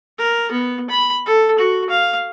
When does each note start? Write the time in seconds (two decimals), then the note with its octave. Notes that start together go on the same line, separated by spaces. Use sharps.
0.19 A#4
0.52 B3
0.90 B5
1.26 A4
1.59 F#4
1.90 F5